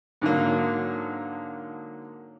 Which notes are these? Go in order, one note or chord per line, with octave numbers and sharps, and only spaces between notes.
G#2 D3 F#3 A#3